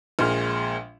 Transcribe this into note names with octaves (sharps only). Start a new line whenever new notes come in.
A#1 A#2 G#3 F6